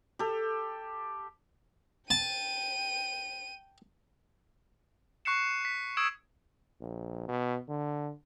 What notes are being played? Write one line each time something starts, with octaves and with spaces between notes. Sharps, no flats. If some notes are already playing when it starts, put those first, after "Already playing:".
G4 A4
G5 A5 D#7
C#6 F#6 C7 C#7 E7
B6
C#6 D#6 E6 G#6 D7 E7
A#1
B2
D3